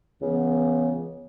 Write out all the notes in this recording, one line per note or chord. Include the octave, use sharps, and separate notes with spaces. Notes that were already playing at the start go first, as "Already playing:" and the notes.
C#2 C#3 E3 B3